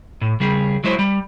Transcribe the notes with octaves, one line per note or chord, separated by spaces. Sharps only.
A2
C#3 G3 G#4
F#3 G#3 E4 C5
G3